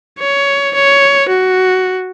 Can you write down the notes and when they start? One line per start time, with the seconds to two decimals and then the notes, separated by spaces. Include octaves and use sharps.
0.19 C#5
0.75 C#5
1.29 F#4